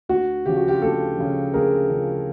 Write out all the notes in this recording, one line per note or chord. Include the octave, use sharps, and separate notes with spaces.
D2 F#4
C#3 F3 G4
F#4
F4 G4
D2 G4 A4
C#3 F3
D2 G#4 A#4
C#3 F3